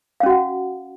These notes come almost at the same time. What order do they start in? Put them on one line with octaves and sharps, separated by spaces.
F5 C#4 F#4 F#5